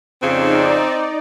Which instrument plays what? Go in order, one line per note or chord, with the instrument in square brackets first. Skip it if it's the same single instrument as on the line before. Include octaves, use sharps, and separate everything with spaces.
[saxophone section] F2 C#3 [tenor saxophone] C4 [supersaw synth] D#4 D5